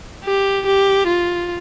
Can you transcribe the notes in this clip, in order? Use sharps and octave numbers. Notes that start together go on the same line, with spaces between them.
G4
G4
F4